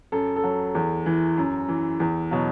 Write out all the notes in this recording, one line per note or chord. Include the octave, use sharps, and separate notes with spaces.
F#2 A4
A4
F#3
E2
E3
F#2
E3
E2
B2 F#3